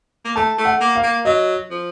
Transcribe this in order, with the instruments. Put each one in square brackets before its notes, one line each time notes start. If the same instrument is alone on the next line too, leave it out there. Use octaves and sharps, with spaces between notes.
[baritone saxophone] A#3
[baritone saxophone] A3 [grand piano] A5
[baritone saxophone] A3
[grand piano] F#5
[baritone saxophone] A#3
[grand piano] F5
[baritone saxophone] A#3
[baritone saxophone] F#3 [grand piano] D#5
[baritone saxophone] F3